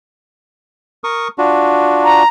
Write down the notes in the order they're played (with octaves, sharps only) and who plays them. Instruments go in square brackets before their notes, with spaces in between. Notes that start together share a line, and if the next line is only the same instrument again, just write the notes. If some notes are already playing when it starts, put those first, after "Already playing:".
[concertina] A#4 C#6 D#6
D4 F4 F#4
[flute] A#5